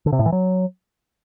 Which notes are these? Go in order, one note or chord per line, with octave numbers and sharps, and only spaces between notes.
D3
C3
A2
E3
F#3